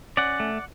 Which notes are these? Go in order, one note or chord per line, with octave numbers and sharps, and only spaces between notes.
C#4 D5 F#5
A3